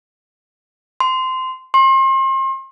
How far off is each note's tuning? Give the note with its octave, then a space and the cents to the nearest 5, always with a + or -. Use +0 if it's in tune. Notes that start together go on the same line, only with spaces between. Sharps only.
C6 -15
C6 +40